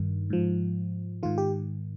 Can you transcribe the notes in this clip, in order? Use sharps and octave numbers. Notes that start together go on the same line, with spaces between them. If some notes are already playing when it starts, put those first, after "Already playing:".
Already playing: G2 D#3
G#2 F3
G#2 D#3 F4
G4